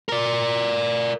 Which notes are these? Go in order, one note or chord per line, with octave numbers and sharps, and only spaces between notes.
A#4 D5